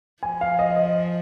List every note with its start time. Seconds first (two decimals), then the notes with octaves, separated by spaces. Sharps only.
0.23 F3 G#5
0.41 F5
0.59 D#5
0.76 D#5